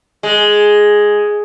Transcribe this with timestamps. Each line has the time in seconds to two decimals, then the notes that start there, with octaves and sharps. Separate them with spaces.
0.23 G#3